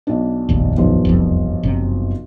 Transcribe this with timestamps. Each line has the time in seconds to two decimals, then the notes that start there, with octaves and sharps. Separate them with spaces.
0.07 B1 D4
0.49 F1 A#1 D#2
0.77 B1 G2 F3
1.05 E1 C2 F2
1.63 F#1 C3